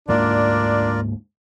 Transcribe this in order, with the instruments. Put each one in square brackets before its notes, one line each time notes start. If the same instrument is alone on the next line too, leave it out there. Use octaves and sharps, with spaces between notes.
[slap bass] D2 G#2 A#3 [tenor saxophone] D4 [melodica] F4 A#4 D5